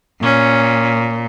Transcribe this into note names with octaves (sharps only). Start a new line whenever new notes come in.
A#2 C#4